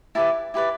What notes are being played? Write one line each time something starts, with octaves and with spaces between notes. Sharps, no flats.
E4 G4 B4 D5 A5
E4 G4 B4 D5